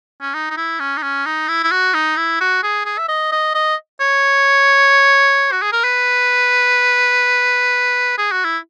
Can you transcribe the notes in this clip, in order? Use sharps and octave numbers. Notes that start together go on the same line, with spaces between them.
C#4
D#4
D#4
E4
C#4
D#4
C#4
D#4
E4
E4
F#4
D#4
E4
F#4
G#4
G#4
E5
D#5
D#5
D#5
C#5
F#4
G#4
A#4
B4
G#4
F#4
E4